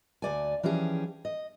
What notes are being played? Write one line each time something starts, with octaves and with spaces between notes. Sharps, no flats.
D2 D5 G#5
E3 F3 C#4 G4 G#4
D#5